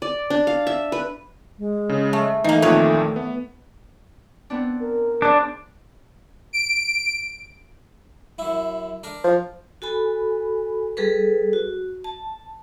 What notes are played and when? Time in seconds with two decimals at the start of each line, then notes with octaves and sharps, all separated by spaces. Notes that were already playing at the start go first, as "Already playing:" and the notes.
0.02 D5
0.30 D4
0.47 F5
0.67 E5
0.92 B4
1.59 G#3
1.89 C#3
2.13 A3
2.44 E3 A3 A#3 D#4
2.62 F2 A#2 D#3 B4 C#5
3.16 B3
4.50 B3 C4 D4
4.81 A#4
5.22 D4 G#4 C5 D5
6.53 D7
8.38 F#2 E4
9.03 D4 A#4
9.24 F3
9.82 F#4 A4 G#5 B5
10.97 G3 G#4 A4 B4
11.53 F#4
12.04 A5